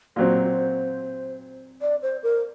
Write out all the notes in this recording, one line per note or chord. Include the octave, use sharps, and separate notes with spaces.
A#2 F#3 C4 C5
D5
C5
A#4